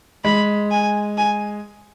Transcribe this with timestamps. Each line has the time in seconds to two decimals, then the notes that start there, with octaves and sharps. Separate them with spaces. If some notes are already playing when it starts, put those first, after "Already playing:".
0.24 G#3 B5
0.71 G#5
1.18 G#5